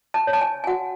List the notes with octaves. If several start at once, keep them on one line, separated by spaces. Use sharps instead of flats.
A5
C#5
A5
G#5
G#5
F#4 F#5